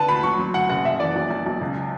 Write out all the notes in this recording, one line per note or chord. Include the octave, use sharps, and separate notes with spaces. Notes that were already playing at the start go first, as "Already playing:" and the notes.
Already playing: D3 B4 A5
D2 B5
F#3 C#6
F#3
D2 F#5
F#1 F#5
F#1 E5
E3 D5
B1
B1
B1
C#2